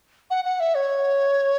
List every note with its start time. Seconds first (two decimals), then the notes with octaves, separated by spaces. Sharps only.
0.30 F#5
0.45 F#5
0.60 E5
0.75 C#5